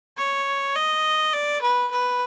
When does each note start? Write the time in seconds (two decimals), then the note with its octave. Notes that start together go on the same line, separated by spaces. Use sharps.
0.18 C#5
0.76 D#5
1.33 D5
1.62 B4
1.91 B4